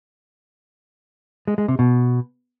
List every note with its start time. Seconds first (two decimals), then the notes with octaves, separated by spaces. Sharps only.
1.48 G#3
1.58 G#3
1.68 C3
1.79 B2